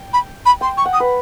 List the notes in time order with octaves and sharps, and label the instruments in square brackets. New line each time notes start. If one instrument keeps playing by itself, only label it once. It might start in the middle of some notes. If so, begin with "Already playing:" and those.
Already playing: [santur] G5
[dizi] B5
B5
[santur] G5 [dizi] C6
[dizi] C#6
[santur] F#5
[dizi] D#6
[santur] B4